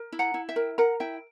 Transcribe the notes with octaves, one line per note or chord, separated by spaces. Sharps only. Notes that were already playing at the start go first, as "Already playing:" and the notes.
Already playing: A#4
E4
F#5 A#5
E4
E5 G5
A#4
A#4 F#5 A#5
E4 E5 G5